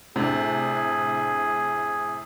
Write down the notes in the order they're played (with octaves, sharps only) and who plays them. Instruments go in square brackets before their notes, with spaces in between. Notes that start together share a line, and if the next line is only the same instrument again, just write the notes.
[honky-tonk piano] A2 C3 D4 [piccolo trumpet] G#4